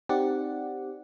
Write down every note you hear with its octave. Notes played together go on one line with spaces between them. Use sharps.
C4 D#4 G4 D5 F#5